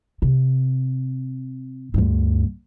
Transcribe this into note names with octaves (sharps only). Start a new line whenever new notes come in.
C3
D2 G2